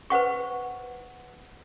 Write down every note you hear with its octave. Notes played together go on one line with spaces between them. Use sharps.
B4 C5 F#5 C#6